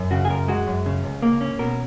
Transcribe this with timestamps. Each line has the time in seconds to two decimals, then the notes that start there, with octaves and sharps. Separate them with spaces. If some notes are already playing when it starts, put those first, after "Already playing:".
Already playing: F#2
0.11 C#3 F#4
0.25 G#4
0.30 F#2 A#4
0.48 G#3 F#4
0.67 F#2
0.86 C#3
1.04 C#2
1.22 A#3
1.41 C#4
1.59 B2 A#4